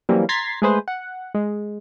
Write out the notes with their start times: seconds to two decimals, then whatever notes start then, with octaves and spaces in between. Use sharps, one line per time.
0.09 E3 F#3 G3 A#3 C4 C#4
0.29 A#5 C6 G#6 A6 B6 C7
0.62 G#3 A3 G#4 B4 C5
0.88 F#5
1.34 G#3